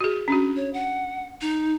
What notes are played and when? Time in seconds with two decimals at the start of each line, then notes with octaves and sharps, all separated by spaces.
0.01 F#4 G#4
0.28 C#4 D4 F#4
0.56 C#5
0.73 F#5
1.41 D#4